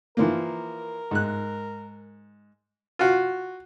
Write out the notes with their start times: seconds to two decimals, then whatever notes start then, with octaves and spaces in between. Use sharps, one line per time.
0.17 E3 F3 A#3 A#4
1.11 G#2 F#6
2.99 F4 F#4